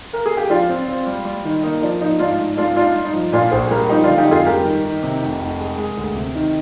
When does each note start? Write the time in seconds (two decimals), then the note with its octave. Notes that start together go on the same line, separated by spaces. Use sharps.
0.13 A#4
0.26 G#4
0.37 G4
0.49 F3 D4 F4
0.69 C4
0.88 C4
1.07 G3
1.25 G3
1.45 D#3
1.63 A#3 D#4
1.82 F3 D4
2.01 F3 D#4
2.19 G#2 D4 F4
2.39 G#2
2.57 G#2 D4 F4
2.76 D4 D#4 F4
2.95 G2
3.05 D#4
3.13 F3
3.32 A#2 D4 F4
3.51 A#1 G#4 C5
3.70 G3 G4 A#4
3.89 F3 D#4 G4
4.04 D3 D4 F4
4.18 D#4 G4
4.27 F2 F4 G#4
4.45 G2 G4 A#4
4.65 D#3
4.84 D#3
5.03 C3
5.22 F1
5.40 F1
5.59 G#3
5.78 G#3
5.97 D2
6.15 C3
6.35 D#3